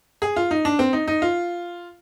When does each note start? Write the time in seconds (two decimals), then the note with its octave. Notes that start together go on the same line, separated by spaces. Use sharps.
0.22 G#4
0.36 F4
0.51 D#4
0.65 D4
0.79 C4
0.93 D#4
1.08 D#4
1.22 F4